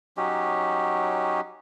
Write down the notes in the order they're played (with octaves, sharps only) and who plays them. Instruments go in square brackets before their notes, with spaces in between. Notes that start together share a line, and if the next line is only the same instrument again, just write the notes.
[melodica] F#3 C#4 D#4 G4